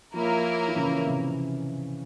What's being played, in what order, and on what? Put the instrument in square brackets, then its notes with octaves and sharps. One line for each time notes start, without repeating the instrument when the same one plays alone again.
[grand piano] F3 [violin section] A#3 E4 A#4 C#5
[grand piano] E3
C#3
C3